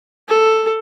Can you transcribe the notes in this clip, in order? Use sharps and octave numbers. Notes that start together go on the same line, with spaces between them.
A4